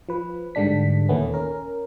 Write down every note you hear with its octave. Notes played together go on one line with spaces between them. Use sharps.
F3 B4
G#2 D3 G3 D4 B6
D#2 A#2 D#3 A3 B3 C#4
C#4 A#4